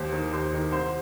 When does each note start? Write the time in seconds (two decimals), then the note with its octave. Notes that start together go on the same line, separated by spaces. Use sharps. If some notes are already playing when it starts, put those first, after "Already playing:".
Already playing: D#2 C5
0.13 D#3
0.33 D#2 C5
0.53 D#3
0.72 C2 C5